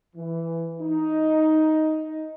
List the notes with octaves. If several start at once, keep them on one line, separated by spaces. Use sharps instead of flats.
E3
D#4